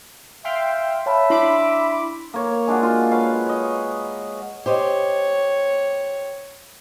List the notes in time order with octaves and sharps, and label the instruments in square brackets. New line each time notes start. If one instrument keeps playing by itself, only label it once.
[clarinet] E5 [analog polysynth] F5 G5 C6
[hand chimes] C#5 A5 B5 [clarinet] E5
[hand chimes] D4 E4 [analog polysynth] B5 C6 D6
[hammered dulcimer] A#3 C#5
G#3 D4 F4 F#4
F4
B4 C#5 F5 F#5
C#5 D#5
[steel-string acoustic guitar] G4 C5 D#5 [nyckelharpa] C#5